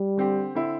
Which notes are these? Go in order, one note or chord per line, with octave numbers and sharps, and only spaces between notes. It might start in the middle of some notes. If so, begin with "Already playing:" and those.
Already playing: G3
D3 C4 G4
D3 C4 E4